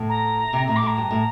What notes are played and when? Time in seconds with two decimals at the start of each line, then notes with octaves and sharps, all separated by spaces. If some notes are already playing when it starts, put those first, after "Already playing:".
Already playing: A2
0.09 A#5
0.53 C3
0.68 A2 A#5
0.76 D6
0.82 A2
0.87 A#5
0.97 G2
1.11 A2